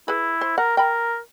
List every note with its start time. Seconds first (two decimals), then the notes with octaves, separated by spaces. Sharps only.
0.08 E4 G#4 B4
0.41 C5
0.58 A#4 F#5
0.77 A#4 G5 B5